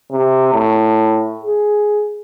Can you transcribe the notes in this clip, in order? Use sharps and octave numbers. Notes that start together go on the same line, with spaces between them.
C3
A2
G#4